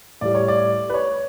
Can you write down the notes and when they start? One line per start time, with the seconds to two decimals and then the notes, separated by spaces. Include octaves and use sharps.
0.21 A2 G3 D5
0.35 C#5
0.48 D5
0.90 B4
0.94 C#5